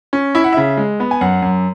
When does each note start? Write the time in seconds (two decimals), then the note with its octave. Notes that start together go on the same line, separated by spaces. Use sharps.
0.13 C#4
0.35 E4 E5
0.44 F#5
0.53 C#3 E5
0.77 G#3
1.00 B3
1.11 G#5
1.21 F#2 F#5
1.42 F#2